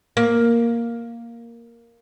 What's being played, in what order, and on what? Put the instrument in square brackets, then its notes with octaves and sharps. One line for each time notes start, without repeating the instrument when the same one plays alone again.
[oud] A#3